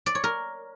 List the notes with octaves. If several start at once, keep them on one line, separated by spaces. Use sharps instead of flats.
D5
C#5
A#4